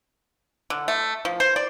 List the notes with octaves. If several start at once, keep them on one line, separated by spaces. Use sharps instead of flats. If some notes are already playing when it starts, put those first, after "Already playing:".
D3
A3
F3
C5
D5